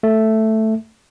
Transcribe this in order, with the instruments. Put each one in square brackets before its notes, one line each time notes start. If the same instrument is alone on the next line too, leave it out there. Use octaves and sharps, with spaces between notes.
[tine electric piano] A3